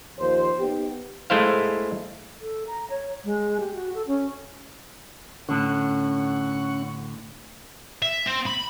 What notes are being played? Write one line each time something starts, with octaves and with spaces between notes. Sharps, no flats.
D#2 F3 C5
B3 D#4 G4
G#3 A3 E4 C5 F5
A4
A#5
C#5
G#3
G4
F#4
A4
C#4
A2 D3 C#4 F#5 C#6
E5
C4
B5